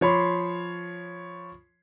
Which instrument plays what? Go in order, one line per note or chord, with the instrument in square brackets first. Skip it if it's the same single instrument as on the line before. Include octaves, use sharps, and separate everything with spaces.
[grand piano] F3 C#5 B5 C6